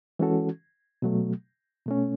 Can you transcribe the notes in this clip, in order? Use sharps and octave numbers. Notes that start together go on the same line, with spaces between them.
E3 G#3 C#4 F#4 A4
B2 F#3 A3
B2 A3 C#4